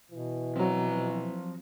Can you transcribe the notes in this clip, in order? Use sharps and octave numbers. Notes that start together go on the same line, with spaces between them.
B2 E3
F3 F#3 C4 A#5